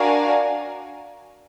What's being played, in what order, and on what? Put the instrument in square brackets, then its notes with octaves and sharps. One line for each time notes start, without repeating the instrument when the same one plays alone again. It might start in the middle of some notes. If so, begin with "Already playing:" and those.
Already playing: [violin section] D4 F#4 A#4 F5 G#5